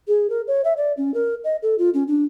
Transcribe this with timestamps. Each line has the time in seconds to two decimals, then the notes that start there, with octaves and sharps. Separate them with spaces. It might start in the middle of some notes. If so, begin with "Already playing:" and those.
0.08 G#4
0.29 A#4
0.47 C#5
0.64 E5
0.77 D5
0.97 C#4
1.14 A#4
1.44 D#5
1.62 A4
1.78 F4
1.94 C#4
2.08 D4